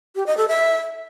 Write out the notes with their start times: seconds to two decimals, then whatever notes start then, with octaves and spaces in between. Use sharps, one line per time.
0.16 G4
0.26 D#5
0.37 A4
0.48 E5